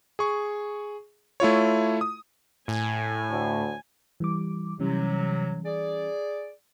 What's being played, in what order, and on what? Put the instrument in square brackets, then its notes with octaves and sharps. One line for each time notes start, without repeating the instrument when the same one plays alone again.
[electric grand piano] G#4 C#6
A3 E4 F4 C#5
D#6
[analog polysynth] A2 [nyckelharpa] G#5
[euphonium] D2
[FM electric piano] E3 G3 D6
[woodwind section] C3 F#3 [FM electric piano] E3 G3 C#4
[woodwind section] G#4 D5